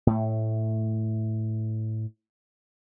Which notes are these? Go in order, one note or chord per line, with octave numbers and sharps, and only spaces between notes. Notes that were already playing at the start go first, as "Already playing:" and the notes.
A2 A3